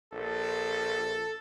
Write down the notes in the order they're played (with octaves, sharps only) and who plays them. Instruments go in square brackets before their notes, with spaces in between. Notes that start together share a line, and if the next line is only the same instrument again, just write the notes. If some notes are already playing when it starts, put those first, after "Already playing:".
[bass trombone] A#1 [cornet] A4